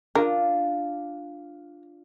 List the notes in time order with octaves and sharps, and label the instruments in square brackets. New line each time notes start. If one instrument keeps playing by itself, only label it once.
[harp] D4 F4 [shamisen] A#4